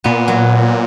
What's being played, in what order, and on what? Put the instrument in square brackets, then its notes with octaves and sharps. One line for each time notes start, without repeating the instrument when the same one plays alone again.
[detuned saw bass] A#2 [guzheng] B3
[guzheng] F#3